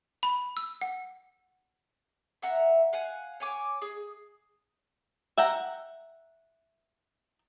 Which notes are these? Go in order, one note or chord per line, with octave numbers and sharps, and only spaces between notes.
B5
E6
F#5
E5 F#5 A#5
F5 F#5 G#5
C#5 G#5 D6
G#4
E5 F#5 G5 A#5